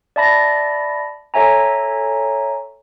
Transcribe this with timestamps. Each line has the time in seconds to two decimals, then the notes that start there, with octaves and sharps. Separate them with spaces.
0.16 D5 E5 A5 B5 A#6
1.34 A4 C#5 E5 G#5 A#5